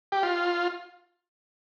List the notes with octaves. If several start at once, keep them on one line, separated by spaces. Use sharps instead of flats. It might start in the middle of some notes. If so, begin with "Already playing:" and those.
G4
F4